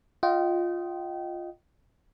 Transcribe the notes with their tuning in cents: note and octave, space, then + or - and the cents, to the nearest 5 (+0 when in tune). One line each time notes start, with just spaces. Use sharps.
F4 +0 D#5 +0 G5 -30